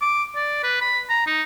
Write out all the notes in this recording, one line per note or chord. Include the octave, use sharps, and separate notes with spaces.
D6
D5
B4
B5
A#5
D#4